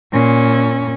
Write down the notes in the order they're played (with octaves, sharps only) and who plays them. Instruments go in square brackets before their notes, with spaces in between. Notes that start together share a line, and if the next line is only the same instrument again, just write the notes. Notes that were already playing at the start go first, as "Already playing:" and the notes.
[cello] A#2 C#4